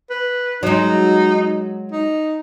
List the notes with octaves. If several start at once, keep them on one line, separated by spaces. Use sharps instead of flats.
B4
F#3 G#3 D#4
D#4